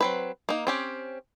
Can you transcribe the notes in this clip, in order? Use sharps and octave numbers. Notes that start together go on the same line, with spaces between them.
F#3 C4 B4
A#3 D#4
C4 C#4 G4